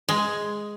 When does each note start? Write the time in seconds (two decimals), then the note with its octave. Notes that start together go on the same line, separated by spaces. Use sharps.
0.09 G#3